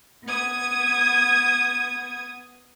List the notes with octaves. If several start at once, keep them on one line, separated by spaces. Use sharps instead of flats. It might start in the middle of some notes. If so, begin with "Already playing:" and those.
B3 D#6 G#6